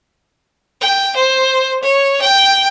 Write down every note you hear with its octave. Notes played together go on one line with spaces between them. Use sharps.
G5
C5
C#5
G5